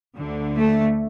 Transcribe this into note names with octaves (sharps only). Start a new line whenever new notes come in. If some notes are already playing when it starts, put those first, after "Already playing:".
D2 D3
A3